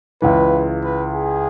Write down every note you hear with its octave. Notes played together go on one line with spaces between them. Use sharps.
C#2 C#3 E3 B4
B4
G#4